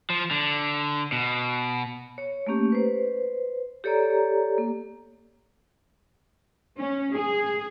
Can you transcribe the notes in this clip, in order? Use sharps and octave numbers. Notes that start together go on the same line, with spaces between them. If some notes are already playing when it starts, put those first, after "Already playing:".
F3
D3
B2
C#5
A3 A#3 C#4 G4
B4 C5
G4 A4 C#5 D5 A#5
A#3
C#4
G#4